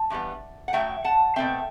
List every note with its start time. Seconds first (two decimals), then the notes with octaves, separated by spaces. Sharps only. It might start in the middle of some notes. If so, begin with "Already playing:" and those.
Already playing: A5
0.10 G2 E3 G3 B3
0.68 F#5
0.73 F#2 F#3 A3 E5 G5
1.04 F#5 A5
1.36 B2 A3 C4 E5 G5